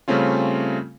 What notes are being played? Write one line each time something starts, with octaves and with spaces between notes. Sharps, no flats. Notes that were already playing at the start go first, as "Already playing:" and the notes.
C#3 G3 A3 C4 C#4 F4